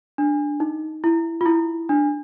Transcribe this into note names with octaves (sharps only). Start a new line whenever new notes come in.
D4
D#4
E4
F4
E4
D4